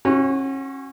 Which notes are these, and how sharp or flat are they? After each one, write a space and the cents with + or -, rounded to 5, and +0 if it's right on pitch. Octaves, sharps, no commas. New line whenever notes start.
C#4 -35 F#4 +0